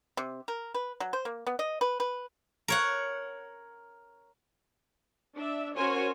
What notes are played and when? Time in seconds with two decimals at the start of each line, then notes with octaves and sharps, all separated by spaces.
0.17 C3
0.48 A#4
0.74 B4
1.00 F#3
1.13 C5
1.25 A#3
1.47 B3
1.59 D#5
1.81 B4
2.00 B4
2.68 A#4 C#5 F#5
5.35 D4 E5
5.75 C#4 F#4 A#4 C5 C#5 G#5